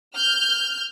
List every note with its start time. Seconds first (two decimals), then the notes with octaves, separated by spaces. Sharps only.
0.14 F6 G6